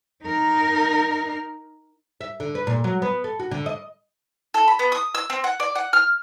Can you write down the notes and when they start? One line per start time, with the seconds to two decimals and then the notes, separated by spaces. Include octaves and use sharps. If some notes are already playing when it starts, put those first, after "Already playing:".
0.24 D#4 A#4
2.21 E5
2.40 D3
2.55 B4
2.67 A#2
2.84 F#3
3.02 B3
3.24 A4
3.40 F#4
3.51 D3
3.66 D#5
4.54 A4
4.68 B5
4.79 B3
4.92 D#6
5.15 E6
5.30 C4
5.44 F#5
5.60 D5
5.75 F#5
5.93 F6